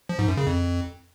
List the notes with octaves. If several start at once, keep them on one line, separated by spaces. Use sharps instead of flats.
F3
G#2
F#2
C#3
F2